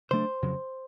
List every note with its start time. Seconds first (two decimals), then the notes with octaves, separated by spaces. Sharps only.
0.11 C#3 F#3 A3 D4 C5
0.42 F2 C#3 F#3